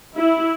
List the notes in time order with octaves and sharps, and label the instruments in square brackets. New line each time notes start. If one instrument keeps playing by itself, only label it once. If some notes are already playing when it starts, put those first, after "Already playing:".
[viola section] E4